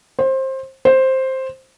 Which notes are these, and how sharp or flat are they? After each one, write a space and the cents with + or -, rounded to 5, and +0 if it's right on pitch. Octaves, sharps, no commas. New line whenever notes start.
C5 +20
C5 +5